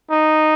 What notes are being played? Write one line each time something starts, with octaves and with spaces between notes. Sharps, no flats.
D#4